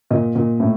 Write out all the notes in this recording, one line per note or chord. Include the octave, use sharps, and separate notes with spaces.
A#2 D#5
A#2
A2